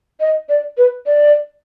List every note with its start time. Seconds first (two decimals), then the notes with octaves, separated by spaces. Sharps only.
0.20 D#5
0.49 D5
0.77 B4
1.06 D5